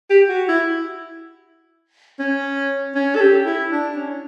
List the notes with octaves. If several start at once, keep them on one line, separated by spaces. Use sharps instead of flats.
G4
F#4
E4
C#4
C#4
A4
G4
E4
D4
C#4